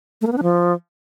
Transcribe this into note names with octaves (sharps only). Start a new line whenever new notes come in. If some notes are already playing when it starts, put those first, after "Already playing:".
A3
A#3
B3
D4
F3